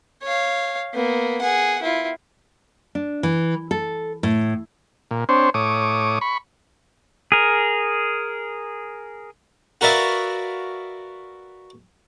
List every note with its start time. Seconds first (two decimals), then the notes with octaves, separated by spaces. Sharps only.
0.23 C#5 F5
0.94 A#3 B3
1.41 G#4 F#5
1.82 E4 F4
2.95 D4
3.23 E3
3.71 A4
4.23 A2
5.11 A#2
5.29 C4 D4 C5 C#5
5.54 A2 C#5 D6 D#6
6.21 B5 C#6
7.32 G#4 A#4
9.81 F#4 A#4 B4 D5 E5 F5